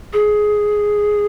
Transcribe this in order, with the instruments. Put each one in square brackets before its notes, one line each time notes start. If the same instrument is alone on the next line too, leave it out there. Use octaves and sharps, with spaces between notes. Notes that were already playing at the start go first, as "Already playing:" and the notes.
[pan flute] G#4